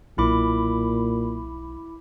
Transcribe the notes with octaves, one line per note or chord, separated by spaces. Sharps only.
B1 A#2 E4 B5 D6